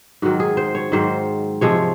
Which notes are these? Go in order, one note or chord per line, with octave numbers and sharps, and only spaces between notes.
G#2 D#3 F#3 F#4
G#4
C5
C#5
G#2 D#3 F#3 C5
C3 F3 G#3 C#5